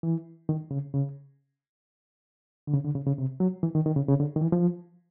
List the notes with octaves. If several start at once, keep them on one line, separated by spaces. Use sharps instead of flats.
E3
D#3
C#3
C#3
D3
C#3
D3
C#3
C#3
C3
F#3
E3
D#3
D#3
C#3
C#3
D3
D#3
E3
F3